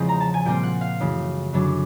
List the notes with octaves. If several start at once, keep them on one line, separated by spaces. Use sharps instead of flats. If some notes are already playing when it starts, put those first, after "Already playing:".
Already playing: E2 C#3 F3 G#3 C4
A#5
A5
G#5
A#2 G3 C4 F4 G5
F#5
F5
F#2 C#3 E3 A3
F#2 D3 F#3 B3 D4